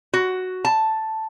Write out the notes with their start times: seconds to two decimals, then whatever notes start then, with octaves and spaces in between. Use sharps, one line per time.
0.14 F#4
0.65 A5